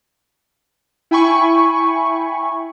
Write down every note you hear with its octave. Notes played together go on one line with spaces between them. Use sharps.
E4 G5 G#5 B5 C#6